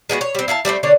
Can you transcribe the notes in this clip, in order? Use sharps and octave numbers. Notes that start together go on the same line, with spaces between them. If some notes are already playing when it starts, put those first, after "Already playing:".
G#3 B3 E4 F#4
C#5
G3 C4
E4 F5 G#5 A5
G3 A3 B3 C4
D3 D4 C#5